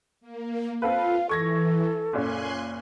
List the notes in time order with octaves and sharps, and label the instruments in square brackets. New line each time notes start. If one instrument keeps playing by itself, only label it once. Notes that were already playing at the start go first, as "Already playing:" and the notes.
[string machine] A#3
[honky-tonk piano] C4 A4 B4 [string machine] F4 [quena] F5
[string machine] E3 [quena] A4 [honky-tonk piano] C#6 G#6 A#6
[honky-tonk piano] F#1 A#2 C#4 [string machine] G#5 C6 F#6